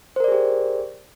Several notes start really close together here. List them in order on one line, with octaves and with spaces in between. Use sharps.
C5 A#4 D5 G#4 G4